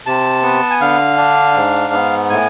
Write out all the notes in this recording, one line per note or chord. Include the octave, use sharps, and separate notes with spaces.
C3 A5
B3
G#5
D3 F5
D4
G#2
B3
A2 G#5